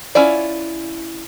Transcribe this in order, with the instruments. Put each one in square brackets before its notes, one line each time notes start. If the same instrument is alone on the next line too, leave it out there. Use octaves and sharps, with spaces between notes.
[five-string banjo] C#4 E4 F4 D5